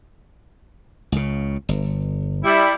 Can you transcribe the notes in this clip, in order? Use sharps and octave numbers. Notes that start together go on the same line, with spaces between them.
C#2 C#3
G1
G3 E4